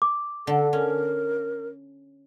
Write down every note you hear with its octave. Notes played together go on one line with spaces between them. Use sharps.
D6
D3 A4
C#4 A#4